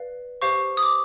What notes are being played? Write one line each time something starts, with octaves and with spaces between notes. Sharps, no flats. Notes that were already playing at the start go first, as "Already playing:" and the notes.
Already playing: B4 D5 F5
G4 C5 F5 C#6
D#6
D6